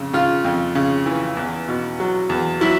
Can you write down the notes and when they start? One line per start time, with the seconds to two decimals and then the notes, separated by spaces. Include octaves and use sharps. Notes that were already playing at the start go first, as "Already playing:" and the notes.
Already playing: F2 C#3
0.13 C#3 F4
0.45 F2
0.75 C#3
1.06 E3
1.37 E2
1.68 B2
2.00 F#3
2.29 E2
2.61 F#3 E4